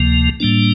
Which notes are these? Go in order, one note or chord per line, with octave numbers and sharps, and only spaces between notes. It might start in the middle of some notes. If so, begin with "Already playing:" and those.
Already playing: D2 C3 F3 A#3
A2 G3 A#3 D4